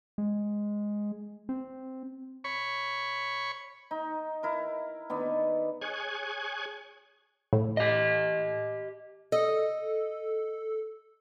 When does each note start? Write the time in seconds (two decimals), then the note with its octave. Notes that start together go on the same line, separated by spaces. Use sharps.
0.18 G#3
1.49 C4
2.44 C#5 B5 C#6
3.91 D#4
4.43 E4 A#4
5.10 D#3 B3 D4
5.82 G#4 C#5 G#5 F#6 G#6
7.53 A2
7.77 G4 D#5
9.32 A4 D#5